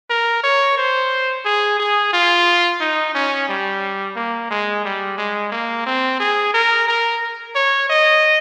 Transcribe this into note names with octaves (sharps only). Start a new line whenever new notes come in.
A#4
C#5
C5
G#4
G#4
F4
D#4
C#4
G3
A#3
G#3
G3
G#3
A#3
C4
G#4
A#4
A#4
C#5
D#5